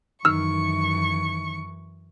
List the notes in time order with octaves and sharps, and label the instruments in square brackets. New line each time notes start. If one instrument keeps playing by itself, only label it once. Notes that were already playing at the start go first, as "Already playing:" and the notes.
[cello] F#2 E3 [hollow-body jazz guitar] D#3 [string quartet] C#6 [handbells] E6 F6